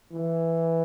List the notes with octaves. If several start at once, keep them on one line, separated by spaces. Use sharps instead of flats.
E3